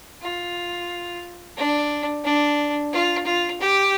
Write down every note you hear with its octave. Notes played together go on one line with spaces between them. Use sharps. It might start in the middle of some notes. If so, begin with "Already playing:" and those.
F4
D4
D4
F4
F4
G4